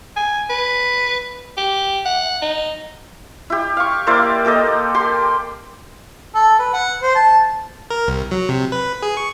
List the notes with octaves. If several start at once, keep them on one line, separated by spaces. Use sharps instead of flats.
G#5
B4
G4
F#5
D#4
E4 G4
F5 C#6
A#3 E4 C5 D5
A#3 G4 A4 D#5
G4 C6
A4
B4
F#5
C5
A5
A#4
C2
F#3
C3
B4
G#4
C#6